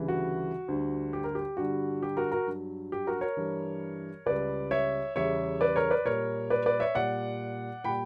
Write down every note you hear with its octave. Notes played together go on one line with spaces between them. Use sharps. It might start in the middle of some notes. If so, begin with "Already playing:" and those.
Already playing: D2 C#3 E3 G3
F#4
D2 D3 G3
G4
A#4
G4
G2 D3 G3 F#4
G4
F#4 A#4
F#4 A#4
G2 F#3
G4
F#4 A#4
A#4 C#5
G2 E3 G3
C#2 C#3 G3 B4 D5
C#5 E5
E2 C#3 G3 C#5 E5
B4 D5
A#4 C#5
B4 D5
A#2 G3 A#4 C#5
B4 D5
B4 D5
C#5 E5
A#2 G3 D5 F#5
A#2 G3 G5 B5